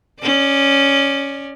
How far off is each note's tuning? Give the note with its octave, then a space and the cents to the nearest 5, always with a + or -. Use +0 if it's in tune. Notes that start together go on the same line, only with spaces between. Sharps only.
C#4 +0 D5 +20